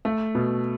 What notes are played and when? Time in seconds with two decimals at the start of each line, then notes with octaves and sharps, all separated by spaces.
0.05 A3
0.35 B2